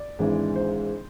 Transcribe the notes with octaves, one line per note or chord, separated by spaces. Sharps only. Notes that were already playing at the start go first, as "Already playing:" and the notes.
Already playing: D5
G#1 G#2 E3 G#3 D4
C5